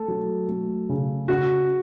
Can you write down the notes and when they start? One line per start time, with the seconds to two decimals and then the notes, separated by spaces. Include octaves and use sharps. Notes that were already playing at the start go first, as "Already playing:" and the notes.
Already playing: A3 A4
0.08 F#3
0.49 A3
0.89 C#3
1.28 C#3 F#4